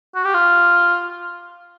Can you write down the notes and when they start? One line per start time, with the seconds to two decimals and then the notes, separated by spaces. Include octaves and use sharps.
0.15 F#4
0.24 G4
0.34 F4